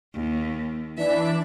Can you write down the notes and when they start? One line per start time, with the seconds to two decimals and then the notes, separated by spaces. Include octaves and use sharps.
0.13 D#2
0.97 E3 D4 D5 E5